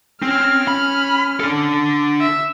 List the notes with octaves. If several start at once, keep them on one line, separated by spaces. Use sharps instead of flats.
C4 C#4 F6
B5
D4 A4
E5